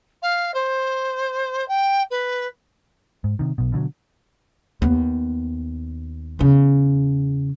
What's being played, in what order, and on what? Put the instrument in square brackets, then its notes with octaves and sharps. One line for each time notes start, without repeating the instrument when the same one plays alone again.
[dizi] F5
C5
G5
B4
[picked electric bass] G#2
C3 D#3
B1 B2
B2 D3 F3 F#3
[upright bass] D#2 B3
E2 C#3